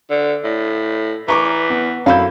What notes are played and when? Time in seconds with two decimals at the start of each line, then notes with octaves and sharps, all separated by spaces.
0.10 D3
0.44 A2
1.28 E3 A#5 C#6 D6
1.70 B3
2.06 F#2 E4 A4 F5 B5 G6